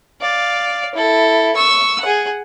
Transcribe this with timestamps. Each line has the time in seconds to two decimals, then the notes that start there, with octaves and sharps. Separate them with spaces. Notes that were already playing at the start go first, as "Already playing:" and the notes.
0.21 D5 F5
0.95 E4 A4
1.55 C#6 E6
2.01 G#4 F#5